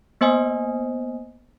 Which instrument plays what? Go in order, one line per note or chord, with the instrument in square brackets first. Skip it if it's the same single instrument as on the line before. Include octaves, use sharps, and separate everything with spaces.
[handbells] A#3 B3 C5 D#5 G#5 D#6